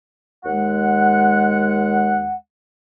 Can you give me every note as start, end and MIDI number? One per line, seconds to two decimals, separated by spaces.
0.44 2.34 39
0.44 2.34 56
0.44 2.34 78